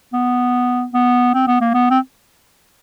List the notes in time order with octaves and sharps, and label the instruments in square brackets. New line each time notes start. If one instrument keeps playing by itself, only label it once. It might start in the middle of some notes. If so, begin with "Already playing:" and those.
[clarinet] B3
B3
C4
B3
A#3
B3
C4